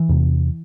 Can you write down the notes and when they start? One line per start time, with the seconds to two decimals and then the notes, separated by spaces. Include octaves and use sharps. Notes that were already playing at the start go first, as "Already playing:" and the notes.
Already playing: E3
0.09 E2 C3